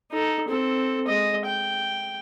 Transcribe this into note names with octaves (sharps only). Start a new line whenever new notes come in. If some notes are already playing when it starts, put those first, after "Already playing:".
D#4 A4
C4 A4
G#3 D#5
G5